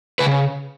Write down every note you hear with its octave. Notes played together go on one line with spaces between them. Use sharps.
C#3 B4